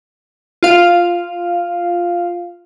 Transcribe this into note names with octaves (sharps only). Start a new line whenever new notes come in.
F4 F5